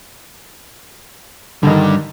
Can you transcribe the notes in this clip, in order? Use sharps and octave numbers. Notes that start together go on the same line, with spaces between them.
G2 D3 D#3 G3